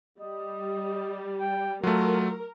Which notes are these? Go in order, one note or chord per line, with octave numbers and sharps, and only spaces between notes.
G3 D#5
G5
F#3 A3 F4 A#4